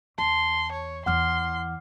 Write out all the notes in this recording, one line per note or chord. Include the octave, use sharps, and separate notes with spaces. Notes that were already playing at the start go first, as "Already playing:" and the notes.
E2 A5 C6
C#5
E2 E3 F#5 C6 D6 F6